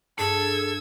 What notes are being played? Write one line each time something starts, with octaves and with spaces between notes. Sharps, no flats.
G2 G#4 A4 E6 G#6